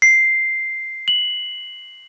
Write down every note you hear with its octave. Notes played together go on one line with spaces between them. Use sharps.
C7
F#7